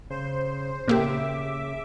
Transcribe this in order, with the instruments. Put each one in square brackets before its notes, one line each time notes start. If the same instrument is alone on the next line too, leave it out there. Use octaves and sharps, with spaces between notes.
[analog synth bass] C#3 [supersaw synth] C5
[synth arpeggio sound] A#2 A#3 G4 [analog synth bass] C#3 [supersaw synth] E5 D6